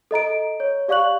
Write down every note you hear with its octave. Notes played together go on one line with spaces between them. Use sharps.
A4 D#5 A#5 D7
C#5
G4 D5 F5 C#6 F#6 F#7